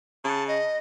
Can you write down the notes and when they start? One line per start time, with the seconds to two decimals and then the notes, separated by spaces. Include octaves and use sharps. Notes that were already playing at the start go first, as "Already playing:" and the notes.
0.24 C#3 A5
0.48 D#5